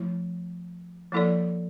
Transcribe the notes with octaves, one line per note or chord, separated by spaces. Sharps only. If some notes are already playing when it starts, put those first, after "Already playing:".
Already playing: F3 A3 E4
F3 A#3 E4 A4 D5